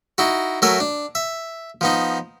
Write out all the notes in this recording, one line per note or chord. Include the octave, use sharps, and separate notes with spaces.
D#4 E4 F#4
F#3 A3 A#4 E5 G#5
D4
E5
F3 B3 D#4